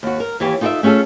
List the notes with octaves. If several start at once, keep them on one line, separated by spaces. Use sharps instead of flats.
D#2 F#4
A#4
D#2 E3 G4 C#5
D#4 F4 A4 A#4 D5 E5
A3 C#4 F4 G#4 A4